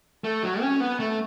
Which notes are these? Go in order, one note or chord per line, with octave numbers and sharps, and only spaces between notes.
A3
F#3
C#4
B3
A3